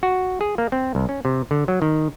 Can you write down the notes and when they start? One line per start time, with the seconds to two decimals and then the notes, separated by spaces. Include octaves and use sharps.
0.03 F#4
0.41 G#4
0.58 A#3
0.72 C4
0.95 C2
1.09 C#4
1.25 C3
1.51 D3
1.68 F#3
1.82 D#3